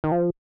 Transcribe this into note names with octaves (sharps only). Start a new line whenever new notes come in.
D#3
F3